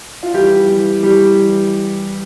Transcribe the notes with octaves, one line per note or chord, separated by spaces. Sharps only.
F4
E3 G3 G4
E3
E3 G3 G4
E3